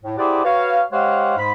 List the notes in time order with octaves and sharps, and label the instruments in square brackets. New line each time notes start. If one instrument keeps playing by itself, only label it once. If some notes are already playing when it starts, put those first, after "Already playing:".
[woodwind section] A2
E4 G4 G#4 C5 D5 F#5
F#4 B4 C#5 F5
G#3 G4 C5 C#5 F5 F#5
G#2 G#3 B5